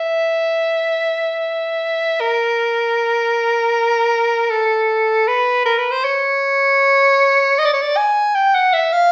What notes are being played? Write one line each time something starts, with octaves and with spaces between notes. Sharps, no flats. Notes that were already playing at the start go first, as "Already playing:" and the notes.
Already playing: E5
A#4
A4
B4
A#4
B4
C5
C#5
D#5
D5
C#5
D5
G#5
G5
F#5
E5
F5